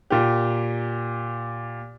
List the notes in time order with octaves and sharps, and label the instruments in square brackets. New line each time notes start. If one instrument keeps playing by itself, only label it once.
[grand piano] A#2 G4